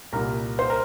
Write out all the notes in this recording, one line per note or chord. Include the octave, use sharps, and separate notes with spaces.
C2 A#2 G3 A#4
C5
A#4